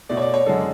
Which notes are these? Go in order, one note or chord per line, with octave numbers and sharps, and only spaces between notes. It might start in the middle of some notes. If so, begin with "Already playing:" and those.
B2 A3 D5
C#5
D5
C#5
F#2 D3 G#3 A4